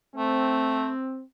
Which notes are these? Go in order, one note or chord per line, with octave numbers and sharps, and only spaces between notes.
A3 C4